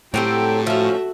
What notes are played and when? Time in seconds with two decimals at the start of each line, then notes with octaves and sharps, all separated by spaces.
0.14 A2 F#3 C4 G4 A4 G5
0.67 F3 A3 C#4 F#4 E5